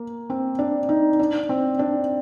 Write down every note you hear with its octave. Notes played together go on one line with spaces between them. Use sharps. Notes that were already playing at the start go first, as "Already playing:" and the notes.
Already playing: A#3
C4
D4
D#4
D4
C4
D4